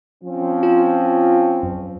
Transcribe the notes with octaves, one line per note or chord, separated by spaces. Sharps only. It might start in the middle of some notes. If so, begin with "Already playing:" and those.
F3 C4 C#4
F4
F#2